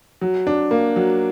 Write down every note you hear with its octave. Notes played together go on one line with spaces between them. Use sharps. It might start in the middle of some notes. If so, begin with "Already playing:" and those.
F#3
D4
A#3
F#3